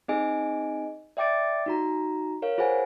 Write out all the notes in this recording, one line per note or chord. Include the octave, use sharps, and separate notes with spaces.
C4 D#4 G#4 D#5 G#5 D7
D5 E5 G5 D6 A6 D7
D#4 F#4 A#5
A#4 C#5 F5
F4 G#4 C5 F#5 G#5